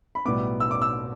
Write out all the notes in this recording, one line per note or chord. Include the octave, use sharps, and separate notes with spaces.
B5
B1 A2 G3 B3 D6
E6
D6
E6